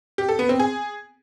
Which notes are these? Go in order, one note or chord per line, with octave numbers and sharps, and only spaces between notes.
G4
A4
B3
C4
G#4